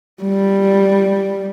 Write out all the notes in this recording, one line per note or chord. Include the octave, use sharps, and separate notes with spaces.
G3